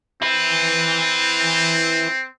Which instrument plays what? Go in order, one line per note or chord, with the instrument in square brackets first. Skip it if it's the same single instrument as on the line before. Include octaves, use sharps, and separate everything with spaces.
[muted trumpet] C4 [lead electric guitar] E4 B4